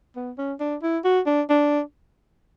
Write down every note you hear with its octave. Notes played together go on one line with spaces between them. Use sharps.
B3
C#4
D4
E4
F#4
D4
D4